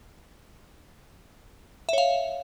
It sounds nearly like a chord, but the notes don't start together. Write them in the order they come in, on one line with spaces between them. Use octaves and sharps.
E5 C#5 F5